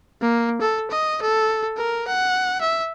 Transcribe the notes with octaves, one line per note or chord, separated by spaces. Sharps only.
A#3
A4
D#5
A4
A#4
F#5
E5